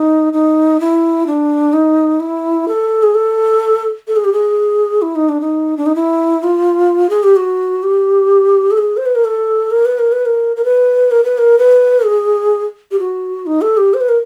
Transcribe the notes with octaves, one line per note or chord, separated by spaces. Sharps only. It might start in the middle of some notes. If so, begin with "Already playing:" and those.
Already playing: D#4
D#4
E4
D4
D#4
E4
A4
G#4
A4
A4
G#4
G4
G#4
E4
D#4
D4
D#4
D4
D#4
E4
F4
G#4
G4
F#4
G4
A4
G#4
C5
B4
A#4
A4
A#4
B4
A#4
B4
A#4
A#4
B4
A#4
B4
A#4
B4
G#4
G4
F#4
D#4
A4
G4
C5
B4
A#4